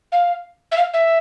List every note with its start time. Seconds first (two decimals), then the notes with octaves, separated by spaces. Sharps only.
0.12 F5
0.71 E5
0.77 F5
0.93 E5